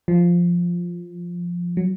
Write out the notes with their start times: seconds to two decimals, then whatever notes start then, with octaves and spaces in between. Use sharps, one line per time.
0.08 F3
1.77 F#3